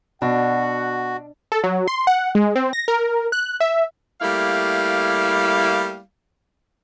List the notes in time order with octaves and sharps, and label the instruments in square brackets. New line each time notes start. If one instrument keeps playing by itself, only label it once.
[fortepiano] B2 [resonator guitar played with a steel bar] D4 [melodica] F#4 [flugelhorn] F#5
[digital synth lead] A4
F#3
C6
F#5
G#3
C4
A#6
A#4
F#6
E5
[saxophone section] G3 A3 A#3 E4 F5